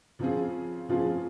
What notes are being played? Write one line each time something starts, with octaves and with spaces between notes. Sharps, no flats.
C#3 F3 C4 F4 G#4
C#3 F3 C4 F4 G#4